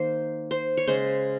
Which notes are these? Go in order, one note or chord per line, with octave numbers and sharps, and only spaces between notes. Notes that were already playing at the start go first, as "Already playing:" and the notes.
Already playing: D#3 A#3 C5
C5
C#5
C#3 G#3 C5